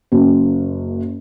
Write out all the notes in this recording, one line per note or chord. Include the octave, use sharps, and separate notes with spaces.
F#1 F#2